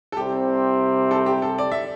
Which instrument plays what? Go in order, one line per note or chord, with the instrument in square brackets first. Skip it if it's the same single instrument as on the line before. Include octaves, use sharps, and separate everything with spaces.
[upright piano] A4
[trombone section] C2 C3 G3 C4 [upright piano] G4
[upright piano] A4
G4
A4
D5
E5